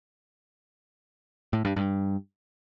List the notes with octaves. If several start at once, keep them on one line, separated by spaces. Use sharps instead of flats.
A2
G2
G2